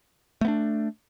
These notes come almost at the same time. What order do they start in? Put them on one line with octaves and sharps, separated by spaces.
A3 B3 D4